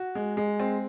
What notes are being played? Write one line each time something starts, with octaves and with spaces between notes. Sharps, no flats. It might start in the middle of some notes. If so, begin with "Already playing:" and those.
Already playing: F#4
G#3
G#3
C4